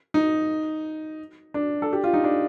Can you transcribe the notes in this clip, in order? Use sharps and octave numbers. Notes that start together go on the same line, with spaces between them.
D#4
D4
A4
G4
F4
D#4
D4